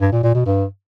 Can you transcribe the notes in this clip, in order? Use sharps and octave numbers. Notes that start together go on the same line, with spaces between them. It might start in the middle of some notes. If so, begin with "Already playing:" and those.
G2
A#2
A#2
B2
G2